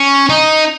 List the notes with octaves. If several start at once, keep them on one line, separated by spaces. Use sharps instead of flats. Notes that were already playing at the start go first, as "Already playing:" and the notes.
Already playing: C#4
D#4